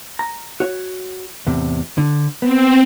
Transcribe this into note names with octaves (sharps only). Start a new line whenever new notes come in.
A#5
F#4 C#5
E2 A2 C3
D3
B3 C4